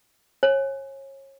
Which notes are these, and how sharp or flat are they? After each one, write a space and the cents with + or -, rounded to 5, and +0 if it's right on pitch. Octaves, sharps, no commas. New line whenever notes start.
C#5 -30 G#5 +10